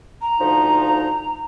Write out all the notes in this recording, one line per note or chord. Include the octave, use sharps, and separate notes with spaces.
A#5
D2 F3 D#4